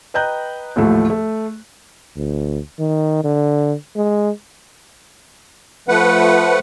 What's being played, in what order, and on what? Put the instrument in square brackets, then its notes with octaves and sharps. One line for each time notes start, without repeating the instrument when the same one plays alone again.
[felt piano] B4 D#5 G5 A#5 F#6 G6
A1 D#2 A2 F3 A3
A3
[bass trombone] D2
D#3
D3
G#3
[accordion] F3 A3 B4 F#5